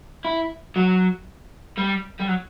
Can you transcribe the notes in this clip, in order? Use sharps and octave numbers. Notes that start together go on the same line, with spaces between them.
E4
F#3
G3
G3
F#3